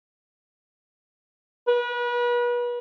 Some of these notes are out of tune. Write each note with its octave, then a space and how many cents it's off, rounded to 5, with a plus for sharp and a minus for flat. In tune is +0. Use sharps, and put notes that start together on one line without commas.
B4 -35